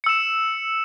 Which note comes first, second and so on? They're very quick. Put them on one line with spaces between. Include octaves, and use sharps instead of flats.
C#7 E6 E7